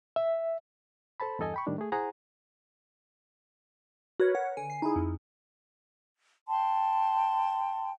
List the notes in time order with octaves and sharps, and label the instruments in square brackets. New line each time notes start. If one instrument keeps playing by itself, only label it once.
[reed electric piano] E5
A4 C5 A5 B5
E2 G2 A4 D#5 G#5
G5 B5 C#6
A2 D#3 G3 D4
A3 G#4
E4 G#4 C5 F#5 G#5 A#5
[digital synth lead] F#4 [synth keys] A#4 B4 C#5
[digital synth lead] F#5
[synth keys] D3 [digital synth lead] G#5
[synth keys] C7
D#4 E4 G#4
F2
[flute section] G5 A5 C6